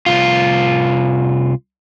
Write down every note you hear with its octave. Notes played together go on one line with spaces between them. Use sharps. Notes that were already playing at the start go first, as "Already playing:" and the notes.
C2 F4